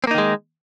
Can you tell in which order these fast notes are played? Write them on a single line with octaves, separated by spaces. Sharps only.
C4 A#3 D#4 D#3 G#3